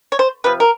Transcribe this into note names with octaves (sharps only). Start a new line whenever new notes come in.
C#5
C5
C3 F3 B4
A#4